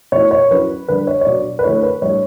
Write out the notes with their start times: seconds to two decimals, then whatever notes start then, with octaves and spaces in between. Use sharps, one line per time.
0.12 B2 A3 E4 C#5
0.31 C#5
0.51 F#3 C#4 E4 B4
0.88 D3 G3 D4 B4
1.07 C#5
1.21 C#5
1.26 B2 F#3 B3 D4 D5
1.59 B4
1.64 D3 A3 E4 C#5
1.83 B4
2.02 A2 G3 D4 C#5